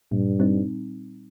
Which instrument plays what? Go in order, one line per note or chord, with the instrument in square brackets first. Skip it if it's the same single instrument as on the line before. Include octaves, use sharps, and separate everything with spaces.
[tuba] G2 [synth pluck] A#2
[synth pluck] G3 C4 D#4